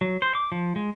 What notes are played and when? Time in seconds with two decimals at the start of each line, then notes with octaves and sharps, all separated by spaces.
0.01 F#3
0.22 C5
0.35 D6
0.52 F3
0.76 G#3